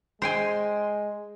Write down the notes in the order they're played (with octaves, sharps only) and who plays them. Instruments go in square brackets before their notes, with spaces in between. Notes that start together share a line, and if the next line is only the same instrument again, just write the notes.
[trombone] G#3 [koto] C5 G5 G#5